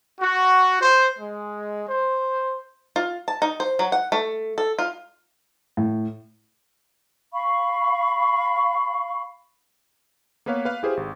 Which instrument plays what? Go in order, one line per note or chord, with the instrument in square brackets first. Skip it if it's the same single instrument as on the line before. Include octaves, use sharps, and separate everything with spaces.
[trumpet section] F#4
C5
G#3
C5
[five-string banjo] F4
A5
D#4
C5
F#3
F#5
A3
A4
F4
[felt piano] A2
[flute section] F5 B5 C#6
[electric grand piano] A#3 B3 B4 C#5 F5
B4 F5
E4 G4 G#4 B4 C5 F5
G#1